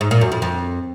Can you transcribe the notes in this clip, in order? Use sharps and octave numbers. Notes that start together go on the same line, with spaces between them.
G#2
A#2
F#2
F2
F2